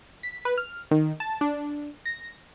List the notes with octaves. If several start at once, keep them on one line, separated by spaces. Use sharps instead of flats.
B6
B4
F6
D#3
A5
D4
A#6